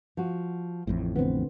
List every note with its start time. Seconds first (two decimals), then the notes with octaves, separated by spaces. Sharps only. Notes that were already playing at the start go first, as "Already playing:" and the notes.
0.17 F3 F#4
0.87 A1 F2 A2
1.16 D3 B3 C4